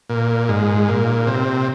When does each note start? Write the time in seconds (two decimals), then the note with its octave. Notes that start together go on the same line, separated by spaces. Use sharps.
0.09 A#2
0.49 G#2
0.88 A#2
1.27 C3